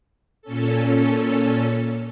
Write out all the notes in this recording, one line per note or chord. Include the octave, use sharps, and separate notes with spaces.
A#2 C#4 A4